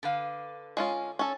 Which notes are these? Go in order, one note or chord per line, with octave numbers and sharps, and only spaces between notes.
D3 B4 F5
G#3 C#4 F4
C#4 A4